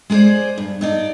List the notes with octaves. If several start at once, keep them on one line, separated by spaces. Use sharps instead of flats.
G#3 G#4 A4 C5 D5
G2
G2 D#4 D5